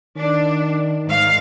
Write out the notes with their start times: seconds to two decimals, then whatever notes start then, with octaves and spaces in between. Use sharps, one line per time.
0.16 D#3 D4
1.06 G#2 F5